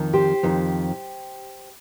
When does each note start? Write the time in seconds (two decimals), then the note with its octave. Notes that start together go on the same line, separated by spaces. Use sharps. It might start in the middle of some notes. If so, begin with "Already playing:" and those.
Already playing: F2 D#3
0.13 G4 C5
0.43 F2 D#3